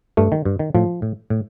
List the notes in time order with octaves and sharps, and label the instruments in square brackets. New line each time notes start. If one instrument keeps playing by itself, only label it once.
[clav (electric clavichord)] G2 A3
D#3
G2
D#3
A2 F3
A2
A2